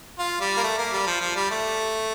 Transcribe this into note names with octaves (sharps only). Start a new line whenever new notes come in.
F4
G3
A#3
A3
A#3
G3
F3
F3
G3
A3